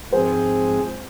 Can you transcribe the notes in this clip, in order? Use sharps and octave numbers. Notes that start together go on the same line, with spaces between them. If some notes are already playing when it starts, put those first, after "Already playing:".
G#2 F3 G#3 C4 G#4 C5